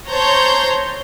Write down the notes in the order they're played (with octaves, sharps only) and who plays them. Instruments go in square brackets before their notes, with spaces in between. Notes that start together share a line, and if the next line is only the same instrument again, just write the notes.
[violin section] C5 C#5 A5 A#5 C6 G6